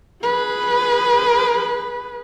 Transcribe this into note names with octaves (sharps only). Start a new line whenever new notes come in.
G#4 B4